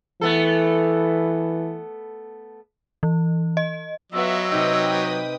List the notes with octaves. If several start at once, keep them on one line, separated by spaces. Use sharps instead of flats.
E3 A3 B3 A4
E3
D#5
F#3 B3 F4 D#5 E5 E6
C3 D#4 B4 G5 D#6